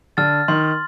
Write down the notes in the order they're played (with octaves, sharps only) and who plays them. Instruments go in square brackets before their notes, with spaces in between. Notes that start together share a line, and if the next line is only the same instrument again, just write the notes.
[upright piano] D3 [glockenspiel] F6 A6
[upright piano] D#3 [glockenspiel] C6